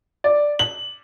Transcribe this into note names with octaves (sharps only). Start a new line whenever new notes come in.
D5
F#7